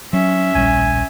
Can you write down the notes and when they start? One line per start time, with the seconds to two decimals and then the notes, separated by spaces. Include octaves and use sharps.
0.13 F#3 C#4 E5
0.55 D1 A#1 G3 G#5